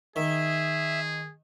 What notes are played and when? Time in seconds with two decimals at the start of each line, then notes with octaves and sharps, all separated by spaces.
0.16 D#3 G#4 E5